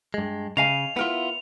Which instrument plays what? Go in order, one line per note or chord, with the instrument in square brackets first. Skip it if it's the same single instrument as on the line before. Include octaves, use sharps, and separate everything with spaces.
[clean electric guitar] G2 G#3
[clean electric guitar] C#3 [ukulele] D#5 F5 G#5 [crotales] F7
[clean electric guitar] B3 F4 [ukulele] E4 A#4